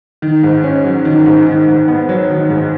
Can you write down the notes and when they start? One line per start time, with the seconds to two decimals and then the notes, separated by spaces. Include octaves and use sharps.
0.22 D#3
0.43 G#2
0.64 C#4
0.84 F#3
1.05 D#3
1.26 G#2
1.46 D#3
1.67 G#2
1.88 B3
2.09 F#3
2.30 D#3
2.50 G#2